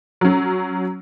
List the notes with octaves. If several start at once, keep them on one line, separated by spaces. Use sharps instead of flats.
F#3 C#4